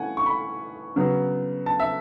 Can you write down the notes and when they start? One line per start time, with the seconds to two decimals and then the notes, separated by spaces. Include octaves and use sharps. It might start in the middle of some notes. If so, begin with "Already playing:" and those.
Already playing: E3 A3 C#4 F#5 G#5
0.17 C#6
0.26 B5
0.96 C#3 F#3 B3
1.66 A5
1.80 E5